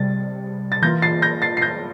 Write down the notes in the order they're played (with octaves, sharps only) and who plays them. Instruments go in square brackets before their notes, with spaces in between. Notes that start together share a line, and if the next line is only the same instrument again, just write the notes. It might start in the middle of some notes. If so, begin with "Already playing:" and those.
Already playing: [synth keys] C3 G3 [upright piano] A6
[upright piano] A6
[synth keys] E3 A#3 F4 [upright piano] G6 A#6
[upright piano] A6 C7
G6 A#6
A6 C7
C7
G6 A#6